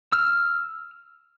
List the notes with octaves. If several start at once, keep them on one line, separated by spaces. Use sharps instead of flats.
E6 F6